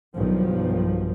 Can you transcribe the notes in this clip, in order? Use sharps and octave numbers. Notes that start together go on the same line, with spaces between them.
B1 G2 D#3 F3